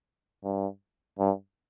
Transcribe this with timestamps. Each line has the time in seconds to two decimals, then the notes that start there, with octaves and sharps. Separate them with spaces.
0.44 G2
1.19 G2